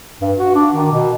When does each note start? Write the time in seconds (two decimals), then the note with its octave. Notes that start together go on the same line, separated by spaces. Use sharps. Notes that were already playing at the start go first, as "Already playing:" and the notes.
0.21 G2
0.37 F#4
0.55 D4
0.73 D#3
0.92 B2